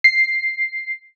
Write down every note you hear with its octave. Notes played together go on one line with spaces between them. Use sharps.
C7